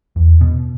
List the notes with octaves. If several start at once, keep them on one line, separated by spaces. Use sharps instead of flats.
E2
B2